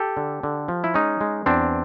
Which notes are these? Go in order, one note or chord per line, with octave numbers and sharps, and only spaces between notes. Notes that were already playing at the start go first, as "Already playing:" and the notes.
Already playing: G4 A4
D3
D3
F3
E4
G#3 C#4 D#4
G#3
E2 C4 D4